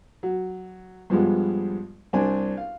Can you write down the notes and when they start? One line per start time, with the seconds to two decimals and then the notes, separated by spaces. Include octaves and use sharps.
0.23 F#3
1.10 G2 F3 G3 G#3 B3
2.13 C2 C4 D4 G#5
2.57 F5